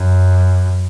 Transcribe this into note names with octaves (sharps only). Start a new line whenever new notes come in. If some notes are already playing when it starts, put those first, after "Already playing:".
Already playing: F#2